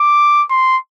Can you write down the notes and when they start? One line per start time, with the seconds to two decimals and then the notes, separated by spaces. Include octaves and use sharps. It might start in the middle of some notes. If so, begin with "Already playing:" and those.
Already playing: D6
0.50 C6